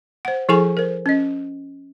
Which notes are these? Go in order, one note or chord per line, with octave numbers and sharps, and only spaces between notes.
C5 F#5
F3 E4 G#4 A4 G#5 C#6
A#4 C5
C#4 D#5